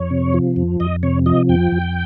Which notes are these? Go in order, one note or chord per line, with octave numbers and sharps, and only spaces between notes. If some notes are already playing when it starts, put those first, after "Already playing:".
Already playing: F2 C#5
C3
F3
F2
F2 D#5
C3 C#5
F3 D#5
F2 G5
F2